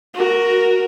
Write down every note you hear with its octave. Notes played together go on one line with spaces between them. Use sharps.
F#4 A#4